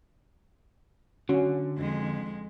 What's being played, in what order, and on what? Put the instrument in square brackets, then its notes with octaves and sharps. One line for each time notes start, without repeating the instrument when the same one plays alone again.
[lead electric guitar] D3 [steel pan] C#4 F#4
[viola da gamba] F2 G#3